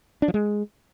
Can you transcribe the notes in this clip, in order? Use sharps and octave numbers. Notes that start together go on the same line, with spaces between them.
D4
F3
G#3